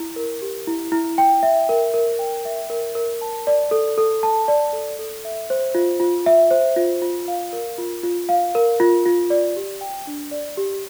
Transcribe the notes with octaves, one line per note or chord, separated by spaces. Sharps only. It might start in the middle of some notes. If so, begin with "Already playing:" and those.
Already playing: E4
A#4
G4
E4
E4
G5
E5
A#4
A#4
G5
E5
A#4
A#4
A5
D5
A4
A4
A5
D5
A4
A4
E5
C5
F4
F4
E5
C5
F4
F4
F5
A#4
F4
F4
F5
A#4
F4
F4
D5
G4
G5
D4
D5
G4